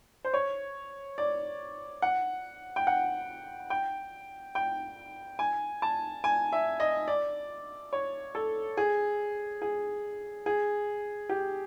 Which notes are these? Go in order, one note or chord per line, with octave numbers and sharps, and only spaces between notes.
C5
C#5
D5
F#5
G5
F#5
G5
G5
G#5
A5
G#5
E5
D#5
D5
C#5
A4
G#4
G#4
G#4
G4